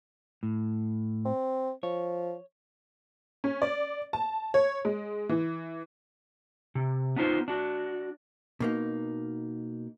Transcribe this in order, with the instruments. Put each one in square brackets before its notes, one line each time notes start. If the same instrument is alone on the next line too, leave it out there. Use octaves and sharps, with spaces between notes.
[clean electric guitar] A2
[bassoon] C4
[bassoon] F3 [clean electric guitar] C#5
[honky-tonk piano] C#4
D5
A5
C#5
G#3
E3
[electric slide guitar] C3
B3 D4 D#4 F4 C5
D4 F#4
[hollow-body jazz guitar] B2 A#3 D#4